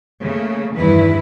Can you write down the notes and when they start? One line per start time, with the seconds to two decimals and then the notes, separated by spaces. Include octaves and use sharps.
0.22 C#3 A3 A#3
0.75 E2 G2 D#3 E3 E4 B4